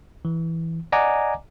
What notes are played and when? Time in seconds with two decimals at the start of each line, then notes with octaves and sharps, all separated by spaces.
0.25 E3
0.92 D5 D#5 F#5 G#5 A#5 D6